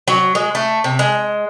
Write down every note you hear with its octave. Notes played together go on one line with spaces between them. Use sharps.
F#3
G#3
A3
C3
G#3